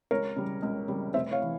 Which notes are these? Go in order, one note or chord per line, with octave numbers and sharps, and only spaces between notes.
C#2 A#4 C#5
C#3 G3
C#2
C#3 G3
F1 C5 E5
C#5 F5
E3